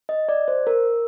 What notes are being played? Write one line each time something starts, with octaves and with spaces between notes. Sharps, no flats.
D#5
D5
C5
A#4